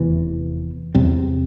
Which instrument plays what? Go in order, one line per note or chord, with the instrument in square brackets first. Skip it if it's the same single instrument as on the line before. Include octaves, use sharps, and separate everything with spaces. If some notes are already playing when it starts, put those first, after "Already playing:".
Already playing: [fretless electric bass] F1 E2 C3 E3
E2 C3 G3 C4